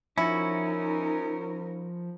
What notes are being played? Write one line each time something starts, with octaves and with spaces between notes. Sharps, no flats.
F3 C#4 D#4 E4 F#4 A#4